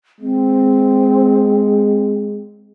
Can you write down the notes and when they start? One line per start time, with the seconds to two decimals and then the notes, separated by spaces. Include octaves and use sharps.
0.21 G#3 C4